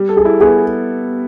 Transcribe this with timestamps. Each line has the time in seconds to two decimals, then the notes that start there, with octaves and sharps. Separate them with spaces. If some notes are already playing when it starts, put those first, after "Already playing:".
Already playing: G3
0.09 A4
0.17 G#4
0.25 E4
0.40 B3 G#4